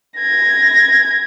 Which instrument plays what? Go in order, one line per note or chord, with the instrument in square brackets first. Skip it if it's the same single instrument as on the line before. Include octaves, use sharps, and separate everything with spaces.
[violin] G#6 A#6